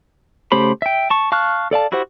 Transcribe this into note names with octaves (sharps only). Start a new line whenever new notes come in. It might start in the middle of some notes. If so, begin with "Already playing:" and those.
C#3 A3 G4 C5 B5
E5 G5
A5 C#6
F5 A5 C#6 F6 F#6
A4 D5 F5 A5
E4 F#4 G4 C5 F#5